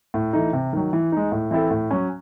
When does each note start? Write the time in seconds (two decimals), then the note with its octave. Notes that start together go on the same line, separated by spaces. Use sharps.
0.14 A2
0.33 E3 A3 D#4
0.53 C3
0.73 D#3 F#3
0.93 E3
1.12 G#3 D#4
1.32 A2
1.51 E3 C4 E4 A4
1.70 A2
1.91 F#3 C#4